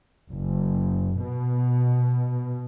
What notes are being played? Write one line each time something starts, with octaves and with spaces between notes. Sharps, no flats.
F#1
B2